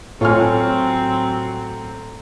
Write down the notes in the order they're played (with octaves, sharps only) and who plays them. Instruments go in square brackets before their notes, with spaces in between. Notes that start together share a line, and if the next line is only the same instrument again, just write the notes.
[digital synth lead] A2 [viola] F#3 C4 [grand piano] F4 C#6 F6 [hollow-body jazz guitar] C#5 G#5